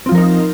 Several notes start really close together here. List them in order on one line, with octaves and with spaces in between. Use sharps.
C4 F4 F3 A#4 D#4